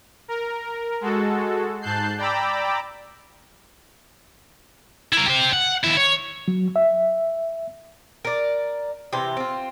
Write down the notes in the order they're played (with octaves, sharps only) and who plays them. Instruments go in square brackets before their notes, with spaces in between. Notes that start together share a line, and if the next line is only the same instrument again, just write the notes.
[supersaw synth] A#4
G#3 F#4 A4
G#2 A5 F#6 G6 C7
D5 G5 A#5 B5 D6 E6
[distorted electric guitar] E4 A#4
G4 C5
F#5
D#2 E4
C#5
[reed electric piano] F#3
E5
[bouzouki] A#4 D5
C3 E3 G4
C4 F4